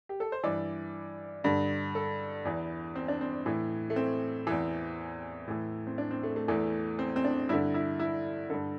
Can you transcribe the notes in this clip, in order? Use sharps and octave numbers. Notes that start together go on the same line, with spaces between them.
G4
A4
C5
G2 E3 D5
G2 D3
A4
E2 E3
C4
D4
C4
A2 E3
A3
C4
E2 E3
A2 E3
C4
D4
C4
A3
A3
E2 E3 A3
C4
C4
D4
G2 D3 E4
E4
E4
G2 D3 A4